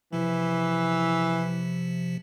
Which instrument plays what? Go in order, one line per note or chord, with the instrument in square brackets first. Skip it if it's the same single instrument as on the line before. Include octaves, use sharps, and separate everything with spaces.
[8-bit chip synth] C3 F3 [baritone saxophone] E3